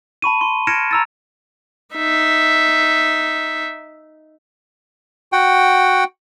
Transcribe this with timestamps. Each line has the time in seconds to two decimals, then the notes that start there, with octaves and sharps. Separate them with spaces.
0.22 A5 B5 C#6 D#7
0.41 C6
0.67 F6 G#6 A#6 C#7 D7 E7
0.91 A#5 E6 A6
1.96 D#4 E5
5.32 F#4 F#5 G5